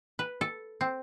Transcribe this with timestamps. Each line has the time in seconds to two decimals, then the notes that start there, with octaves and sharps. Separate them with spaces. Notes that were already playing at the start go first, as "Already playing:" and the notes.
0.19 B4
0.41 A4
0.81 C4